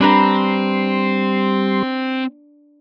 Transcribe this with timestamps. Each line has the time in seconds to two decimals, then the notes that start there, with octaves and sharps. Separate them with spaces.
0.01 G3 C4 D4 B4 A#5 C6